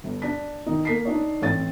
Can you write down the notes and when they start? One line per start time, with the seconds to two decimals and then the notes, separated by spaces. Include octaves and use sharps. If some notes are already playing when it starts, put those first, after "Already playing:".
0.04 G1
0.22 D4 B6
0.66 D#3 D#4
0.85 A#3 B6 C7
1.05 D4 D#4 C#5
1.42 A1 C4 C#5 A6